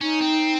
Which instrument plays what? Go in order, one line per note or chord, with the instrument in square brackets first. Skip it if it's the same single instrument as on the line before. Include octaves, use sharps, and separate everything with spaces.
[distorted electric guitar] C#4 [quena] D#4
[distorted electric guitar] C4